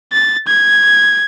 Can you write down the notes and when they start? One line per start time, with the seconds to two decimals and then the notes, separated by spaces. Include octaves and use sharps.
0.13 A6
0.47 G#6